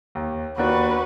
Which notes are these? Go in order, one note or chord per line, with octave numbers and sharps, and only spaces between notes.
D#2
D#2 A#3 D4 F#4 B4